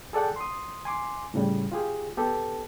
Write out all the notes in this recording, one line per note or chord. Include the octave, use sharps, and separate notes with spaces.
G#4 A4 D5 F#5 G5
C6 D#6
G#5 C6 D6
A2 C#3 G3
F4 G4 G#4
B3 G4 A4